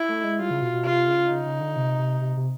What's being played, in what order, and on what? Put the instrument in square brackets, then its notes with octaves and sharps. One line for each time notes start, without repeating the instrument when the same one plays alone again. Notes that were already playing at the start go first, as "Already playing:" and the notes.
Already playing: [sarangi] E4
[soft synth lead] A3
G#3
[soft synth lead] G3 [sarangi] F4
[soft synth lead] C#3
B2
B2
[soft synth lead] C3 [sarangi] F4
[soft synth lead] C#3
[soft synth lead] C#3 [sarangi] D#4
[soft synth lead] C#3
D3
C3
C3
C3
C3